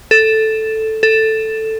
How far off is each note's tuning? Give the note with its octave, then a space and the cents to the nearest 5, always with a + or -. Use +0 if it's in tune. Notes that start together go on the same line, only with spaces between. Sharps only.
A4 +0
A4 +5